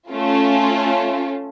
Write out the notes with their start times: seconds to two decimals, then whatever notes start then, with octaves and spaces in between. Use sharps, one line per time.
0.10 A3 C#4 F4